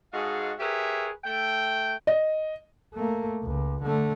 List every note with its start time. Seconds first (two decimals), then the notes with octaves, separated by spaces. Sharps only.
0.13 G#2 G#3 F#4 G#4 A4 F5
0.59 G4 G#4 A#4 B4 C#5 E5
1.24 A3 G5
2.07 D#5
2.94 A3 A#3
3.43 C#2
3.83 D3 A3